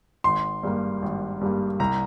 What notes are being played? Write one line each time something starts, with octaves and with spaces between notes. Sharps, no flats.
G#1 C6
G2 G3 A#3
G#1
G2 G3 A#3
C2 A#5